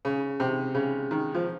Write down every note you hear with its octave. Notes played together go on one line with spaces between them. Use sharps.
C#3
C3
C#3
D#3
F3